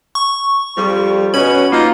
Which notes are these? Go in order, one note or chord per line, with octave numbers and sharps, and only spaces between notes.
C#6
F2 F3 G3
B2 C#4 B5
A#3 D#4 F4